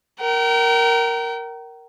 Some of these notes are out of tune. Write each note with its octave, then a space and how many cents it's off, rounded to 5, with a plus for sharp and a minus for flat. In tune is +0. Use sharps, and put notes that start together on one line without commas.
A#4 +0 G5 -40